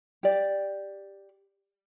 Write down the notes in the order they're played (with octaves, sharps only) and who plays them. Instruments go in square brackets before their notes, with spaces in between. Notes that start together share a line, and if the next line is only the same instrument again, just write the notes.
[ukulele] G4 D5